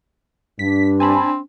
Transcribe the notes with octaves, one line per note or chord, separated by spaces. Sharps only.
G2 D4 B6
C4 G#5 A5 B5